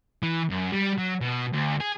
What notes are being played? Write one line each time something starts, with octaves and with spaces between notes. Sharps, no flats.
E3
F#2
G3
F#3
B2
D2
G#4